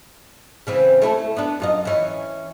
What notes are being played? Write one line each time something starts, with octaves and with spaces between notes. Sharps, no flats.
C#3 E3 C4
A3 E4 A4
B3 D4
F#2 F4 D#5
E3 C#4